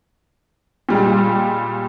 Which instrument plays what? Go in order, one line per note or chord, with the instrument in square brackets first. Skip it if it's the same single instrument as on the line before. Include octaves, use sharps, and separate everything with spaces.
[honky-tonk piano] A#2 G3 G#3